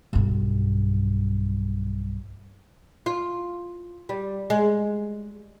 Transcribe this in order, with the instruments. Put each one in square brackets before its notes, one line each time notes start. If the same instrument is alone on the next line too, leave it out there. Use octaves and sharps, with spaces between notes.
[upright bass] B1 G2
[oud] F4
G3
G#3